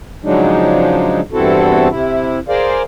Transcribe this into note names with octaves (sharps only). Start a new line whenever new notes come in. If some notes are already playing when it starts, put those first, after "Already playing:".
C#3 F3 F#3 G#3 D4 D#4
E2 G2 C4 E4 F#4 A4
C3 E4
G#4 A#4 C5 D5 F5